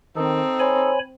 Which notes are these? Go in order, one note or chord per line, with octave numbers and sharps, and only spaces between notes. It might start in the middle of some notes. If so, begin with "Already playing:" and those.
D#3 C4 D#4 A4
C5 C#5 G#5 B5